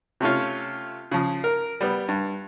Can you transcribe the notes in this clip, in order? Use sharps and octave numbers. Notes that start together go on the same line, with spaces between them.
C3 A3 C#4 F4
C#3 F3
A#4
G3 B3
G2